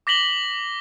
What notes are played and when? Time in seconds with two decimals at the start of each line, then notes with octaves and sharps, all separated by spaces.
0.07 D6 A#6 B6 F#7 G7